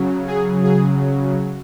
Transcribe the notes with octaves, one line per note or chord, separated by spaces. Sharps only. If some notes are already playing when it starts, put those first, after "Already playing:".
Already playing: C#3 F#3
G#4
G#4